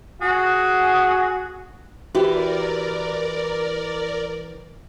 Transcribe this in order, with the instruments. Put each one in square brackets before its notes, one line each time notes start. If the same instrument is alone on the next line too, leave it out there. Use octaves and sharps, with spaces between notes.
[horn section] F#4 G#4
[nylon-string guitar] E3 E4 G4 [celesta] F#4 [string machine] A#4 D5